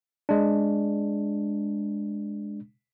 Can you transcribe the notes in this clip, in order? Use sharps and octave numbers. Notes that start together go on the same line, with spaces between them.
G#3 D4